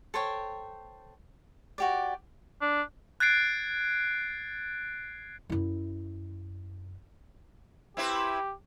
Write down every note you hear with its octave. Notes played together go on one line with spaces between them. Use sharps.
A4 C5 C#5 G5
F#4 G4 D5
D4
F#6 G#6 A6 C7 D7
F#2 E4
C4 E4 G4 B4